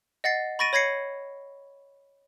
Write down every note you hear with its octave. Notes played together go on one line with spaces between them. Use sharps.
D#5 F#5 A6 C7
B5 C#6 A6 A#6 D7 D#7
C#5 B5 G#6 A#6 C7 C#7